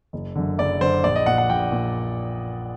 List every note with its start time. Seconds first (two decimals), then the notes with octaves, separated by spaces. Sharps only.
0.13 F#1
0.36 F#2 D3
0.58 F#1 D5
0.81 F#2 D3 C5
1.04 A#1 D5
1.16 D#5
1.26 A#2 F#5
1.38 F#5
1.49 A#1 G5
1.72 A#2